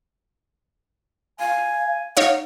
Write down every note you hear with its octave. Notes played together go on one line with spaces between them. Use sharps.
F5 G#5
D#4 C#5 F5 F#5